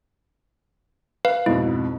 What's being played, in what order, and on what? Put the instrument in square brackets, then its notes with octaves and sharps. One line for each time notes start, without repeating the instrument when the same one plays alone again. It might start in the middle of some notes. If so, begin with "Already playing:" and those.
[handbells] B4 F5
[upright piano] F2 G#2 B2 [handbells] E4